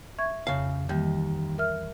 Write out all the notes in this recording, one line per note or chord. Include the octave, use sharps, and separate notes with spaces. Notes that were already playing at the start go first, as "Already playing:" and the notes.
E5 C#6 G#6
F2 C#3 F5
D#2 D#3 E3 G3
A#4 E5 F6